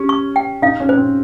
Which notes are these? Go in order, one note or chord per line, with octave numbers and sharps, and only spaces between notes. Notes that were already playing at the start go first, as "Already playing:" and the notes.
Already playing: C#4 G4
C#6
G5
D#4 F5
C#4
C5
C4